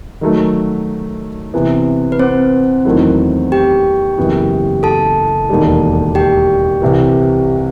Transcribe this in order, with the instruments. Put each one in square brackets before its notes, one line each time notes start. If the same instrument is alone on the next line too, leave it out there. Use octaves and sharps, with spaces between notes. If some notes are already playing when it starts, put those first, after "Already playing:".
[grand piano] D#3 F#3 A3
C3 E3 B3
[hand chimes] B4
C4 C5
[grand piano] E2 D#3 F#3 A3 E4
[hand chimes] G4 G5
[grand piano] F#1 F#2 E3 B3
[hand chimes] A4 A5
[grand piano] E1 D#2 D#3 G3
[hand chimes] G4 G5
[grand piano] C2 C3 E3